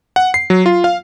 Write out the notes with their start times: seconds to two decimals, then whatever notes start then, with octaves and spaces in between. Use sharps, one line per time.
0.16 F#5
0.34 C7
0.50 F#3
0.66 F4
0.84 F5